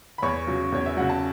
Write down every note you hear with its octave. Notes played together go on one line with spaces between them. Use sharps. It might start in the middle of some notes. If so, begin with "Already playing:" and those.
B5
E2 C#5 C#6
C#3 F#3
E2 C#5
E5
C#3 F#3 F#5
A5